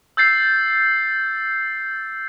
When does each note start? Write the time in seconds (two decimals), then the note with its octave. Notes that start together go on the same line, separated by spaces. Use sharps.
0.17 E6 G6 A6 C7